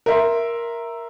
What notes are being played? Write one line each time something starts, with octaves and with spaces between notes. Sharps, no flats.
A#4 E5 C6